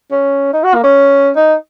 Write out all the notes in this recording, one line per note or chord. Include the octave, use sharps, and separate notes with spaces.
C#4
D#4
F#4
A#3
C#4
D#4